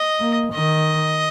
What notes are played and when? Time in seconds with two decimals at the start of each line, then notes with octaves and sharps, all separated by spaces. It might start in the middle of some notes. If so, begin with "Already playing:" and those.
Already playing: D#5
0.21 A#3
0.54 D#3 D#5